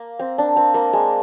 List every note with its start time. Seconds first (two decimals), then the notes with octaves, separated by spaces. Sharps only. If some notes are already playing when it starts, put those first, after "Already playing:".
Already playing: A#3
0.19 C4
0.38 D4
0.56 C4
0.74 A#3
0.93 G#3